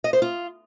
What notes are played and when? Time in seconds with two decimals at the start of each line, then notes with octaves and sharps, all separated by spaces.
0.04 D#5
0.13 C5
0.22 F4